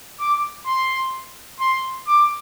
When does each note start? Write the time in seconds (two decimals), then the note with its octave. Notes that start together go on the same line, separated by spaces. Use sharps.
0.20 D6
0.67 C6
1.60 C6
2.07 D6